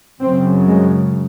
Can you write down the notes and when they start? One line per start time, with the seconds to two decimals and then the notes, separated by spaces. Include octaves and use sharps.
0.21 F#2 C#3 C4
0.68 G#3